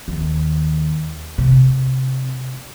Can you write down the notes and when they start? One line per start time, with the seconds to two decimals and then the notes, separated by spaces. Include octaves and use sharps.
0.08 D#2
1.38 C3